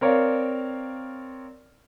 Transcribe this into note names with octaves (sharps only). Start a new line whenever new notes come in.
C4 A#4 C#5 D5 F5